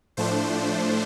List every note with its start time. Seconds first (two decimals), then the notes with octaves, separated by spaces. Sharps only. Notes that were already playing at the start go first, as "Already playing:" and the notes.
0.17 A2 F3 A3 D4 C5